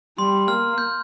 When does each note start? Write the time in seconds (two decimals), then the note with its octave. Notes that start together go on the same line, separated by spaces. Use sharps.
0.18 G3 C6
0.48 A#3 F6
0.78 G6